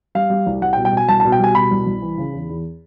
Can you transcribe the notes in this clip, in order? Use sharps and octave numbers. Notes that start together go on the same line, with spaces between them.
G3 F5
G3
C2
G3 F#5
G5
B2
G5
B2 G#5
C2 A5
A5
B2
G5
G3 G#5
B2 B5
C2
C2
E3
C#3
E2
E2